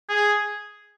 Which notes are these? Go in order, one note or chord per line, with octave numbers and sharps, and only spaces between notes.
G#4